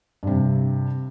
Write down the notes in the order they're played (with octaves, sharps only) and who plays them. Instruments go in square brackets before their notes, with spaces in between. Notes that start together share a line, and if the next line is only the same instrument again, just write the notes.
[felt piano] G2 C3